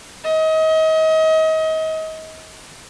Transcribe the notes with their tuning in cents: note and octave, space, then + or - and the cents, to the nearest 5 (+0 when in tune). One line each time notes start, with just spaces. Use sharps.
D#5 +35